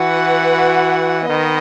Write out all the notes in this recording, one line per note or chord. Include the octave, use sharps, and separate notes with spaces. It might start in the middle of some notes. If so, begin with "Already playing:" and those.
Already playing: E3 F#4 B4 F#5
D#3 B3 D#5